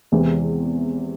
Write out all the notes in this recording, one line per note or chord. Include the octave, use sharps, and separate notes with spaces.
E2 C3 E3 G#3 C4